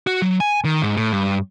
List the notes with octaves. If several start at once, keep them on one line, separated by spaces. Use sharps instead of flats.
F#4
F#3
G#5
D#3
G#2
A2
G2